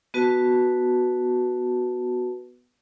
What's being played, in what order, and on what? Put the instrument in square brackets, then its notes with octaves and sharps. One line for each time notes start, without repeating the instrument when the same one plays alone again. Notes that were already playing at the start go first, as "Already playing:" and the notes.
[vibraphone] B3 F#4 B4 A5